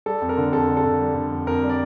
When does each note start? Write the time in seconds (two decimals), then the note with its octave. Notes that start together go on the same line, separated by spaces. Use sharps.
0.06 G3 A4
0.22 F2
0.29 A#4
0.37 D3
0.52 F2 A4
0.68 D3
0.77 A4
0.84 D3
1.00 G3
1.15 D3
1.32 F2
1.47 F2 A#4
1.62 G3
1.69 D5